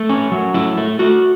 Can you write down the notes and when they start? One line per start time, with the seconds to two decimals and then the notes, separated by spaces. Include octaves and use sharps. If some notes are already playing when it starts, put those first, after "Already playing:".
Already playing: A3
0.09 C#4
0.31 F#3
0.54 A3 E4
0.78 A3
0.99 A3 F#4